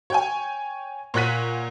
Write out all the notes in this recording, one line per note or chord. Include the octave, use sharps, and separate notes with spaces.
C#5 G5 G#5
A#2 C#5 F#5 F#6 B6 D#7